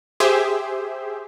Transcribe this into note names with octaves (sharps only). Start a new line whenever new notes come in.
G4 G#4 C5 E5